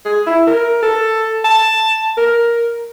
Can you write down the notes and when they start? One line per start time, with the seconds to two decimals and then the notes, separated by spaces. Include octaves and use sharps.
0.06 G#4
0.27 E4
0.47 A#4
0.83 A4
1.45 A5
2.18 A#4